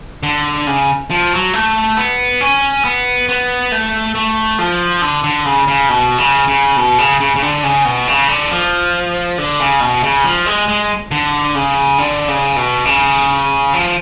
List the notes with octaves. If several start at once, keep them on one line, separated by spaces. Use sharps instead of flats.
D3
C#3
F3
F#3
A3
B3
C#4
B3
B3
A3
A3
F3
D3
D3
C#3
C#3
B2
C#3
C#3
B2
C#3
C#3
C#3
D3
C#3
B2
C#3
D3
F3
D3
C#3
B2
C#3
F3
G#3
G#3
D3
C#3
D3
C#3
B2
C#3
F3